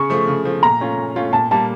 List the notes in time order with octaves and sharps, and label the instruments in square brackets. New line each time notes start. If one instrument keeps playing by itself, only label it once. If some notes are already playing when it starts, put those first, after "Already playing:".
Already playing: [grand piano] C#3 [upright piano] C#6
[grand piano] F3 A3
C#3
F3 A3
[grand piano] A#2 [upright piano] A#5
[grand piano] A3 C#4 F4
A#2
A3 C#4 F4
[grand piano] A#2 [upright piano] A5
[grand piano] G3 A#3 [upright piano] A5